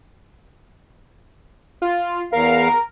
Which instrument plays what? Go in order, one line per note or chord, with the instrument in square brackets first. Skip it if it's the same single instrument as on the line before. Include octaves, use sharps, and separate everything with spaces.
[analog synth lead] F4
[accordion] E2 F5 [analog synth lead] A#4